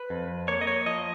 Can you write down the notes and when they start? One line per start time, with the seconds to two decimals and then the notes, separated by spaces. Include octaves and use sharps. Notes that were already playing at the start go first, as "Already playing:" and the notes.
Already playing: B4
0.10 F2
0.48 A#3 C#5
0.61 D#5
0.67 C#5
0.86 F3 D#5